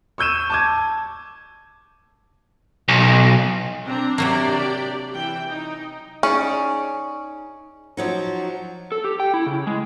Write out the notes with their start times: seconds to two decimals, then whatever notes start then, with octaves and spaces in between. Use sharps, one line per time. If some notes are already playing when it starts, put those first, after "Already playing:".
0.18 C#6 E6 G6 D#7 E7
0.50 A5 D6 G#6
2.88 B1
3.84 C4 D4 A#5
4.18 C3 F#3 A#3 D4 G4 D5
5.14 E3 G5
5.48 D#4
6.23 C#4 D#4 G#4 D5
7.97 F3 F#3 D#4
8.92 A4
9.05 G4
9.20 G5
9.34 E4
9.46 C#3
9.67 G#3